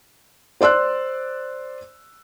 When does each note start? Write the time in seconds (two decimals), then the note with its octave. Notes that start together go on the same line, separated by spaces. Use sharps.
0.61 C5 D5 C6 E6 F#6